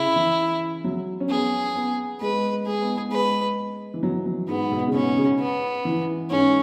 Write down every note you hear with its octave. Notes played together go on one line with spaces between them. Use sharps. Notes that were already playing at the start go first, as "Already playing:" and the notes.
Already playing: C#3 E4
E3
F#3
C#4
B3 G#4
B3
G#3 B4
G#3 G#4
B3
B3
G#3 B4
E3
F#3
F#3
G#2 B3
B2
C#3
B2 C#4
C#3
B3
E3
G#2 C#4